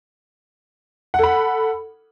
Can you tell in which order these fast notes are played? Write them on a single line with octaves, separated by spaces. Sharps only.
F#5 A4 B5